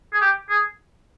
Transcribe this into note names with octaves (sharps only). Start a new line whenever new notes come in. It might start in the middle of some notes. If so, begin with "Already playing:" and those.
G#4
G4
G#4